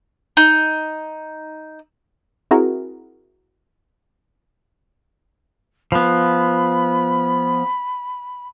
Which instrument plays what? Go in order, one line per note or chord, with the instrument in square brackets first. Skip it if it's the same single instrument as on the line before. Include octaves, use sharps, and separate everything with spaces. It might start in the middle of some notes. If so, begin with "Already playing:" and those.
[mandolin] D#4
[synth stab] C4 E4 F#4 G#4 A#4
[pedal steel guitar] F3 B3 [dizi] B5